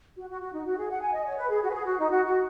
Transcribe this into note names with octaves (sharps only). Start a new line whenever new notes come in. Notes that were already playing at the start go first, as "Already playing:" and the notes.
F#4
F#4
F#4
D#4
F#4
G#4
F#5
G#5
D#5
C#5
B4
G#4
F#4
B4
G#4
F#4
D#4
F#4
F#4